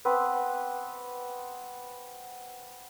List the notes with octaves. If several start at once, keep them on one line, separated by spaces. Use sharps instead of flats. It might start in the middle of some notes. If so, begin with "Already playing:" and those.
B3 C4 B4 D6